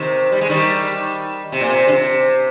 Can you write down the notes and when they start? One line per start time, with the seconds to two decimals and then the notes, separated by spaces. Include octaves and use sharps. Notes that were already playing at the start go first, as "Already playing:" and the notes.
Already playing: C3 D#3
0.32 G3
0.41 G#3
0.49 D#3 G3
1.52 C3
1.61 A#2
1.70 C3
1.87 D3
1.92 C3